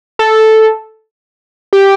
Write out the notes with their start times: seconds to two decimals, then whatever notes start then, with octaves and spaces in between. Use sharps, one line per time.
0.19 A4
1.73 G4